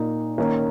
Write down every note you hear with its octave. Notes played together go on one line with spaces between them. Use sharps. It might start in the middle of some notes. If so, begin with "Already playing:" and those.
Already playing: A#2 A#3 D#4
D#3 A#3 C#4